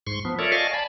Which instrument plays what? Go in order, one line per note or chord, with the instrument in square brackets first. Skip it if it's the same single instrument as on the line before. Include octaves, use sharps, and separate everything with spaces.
[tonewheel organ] G#2 C6 C#6
F3 B3
F4 A4 A#4 C#5 D5 E5
D5 D#5 F5 G#5 A5 C#6
D5 G#5 A5 B5